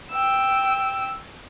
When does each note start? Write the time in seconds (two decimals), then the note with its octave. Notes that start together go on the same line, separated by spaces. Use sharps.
0.11 G5 E6